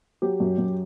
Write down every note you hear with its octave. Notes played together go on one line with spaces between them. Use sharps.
F#3 G4
F#2
F#2